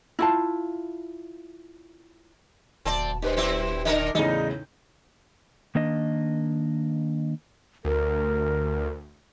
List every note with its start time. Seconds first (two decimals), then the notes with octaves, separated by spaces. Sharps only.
0.19 E4 F4 A5
2.85 D#1 D2 C4 D5 A5
3.22 G2 G4 B4 C5
3.36 F#2 C4 E4
3.85 D3 D4 A#4
4.15 E2 A2 C#3 D#4 D5 A#5
5.75 D#3 A#3 D4 D#5
7.85 D2 A#4